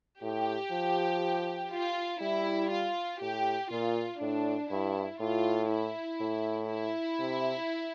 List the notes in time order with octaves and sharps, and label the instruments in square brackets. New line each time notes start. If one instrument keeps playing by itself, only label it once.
[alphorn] A2 [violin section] G4
[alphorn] F3
[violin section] F4
[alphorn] G3 [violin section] E4
[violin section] F4
[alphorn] A2 [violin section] G4
[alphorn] A#2 [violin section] F4
[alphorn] A2 [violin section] D4
[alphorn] G2 [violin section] E4
[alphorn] A2 [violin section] F4
[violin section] E4
[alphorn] A2
[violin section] E4
[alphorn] C3